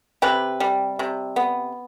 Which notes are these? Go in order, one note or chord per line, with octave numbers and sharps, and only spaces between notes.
C3 G4 B4
G3
C3
B3